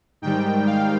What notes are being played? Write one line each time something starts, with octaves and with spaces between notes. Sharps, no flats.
G#2 D#3 G3 G5
F5